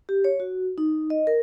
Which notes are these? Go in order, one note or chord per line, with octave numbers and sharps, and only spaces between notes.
G4
C#5
F#4
D#4
D#5
A#4